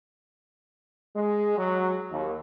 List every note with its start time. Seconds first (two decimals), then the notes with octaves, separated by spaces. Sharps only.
1.15 G#3
1.57 F#3
2.11 D#2